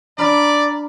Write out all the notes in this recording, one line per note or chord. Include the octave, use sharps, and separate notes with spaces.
D4 D5 A#5 B5 F6